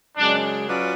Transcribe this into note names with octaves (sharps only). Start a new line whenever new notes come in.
F#2 C#3 G#3 D4
F#3 C#4 F4 B4 D5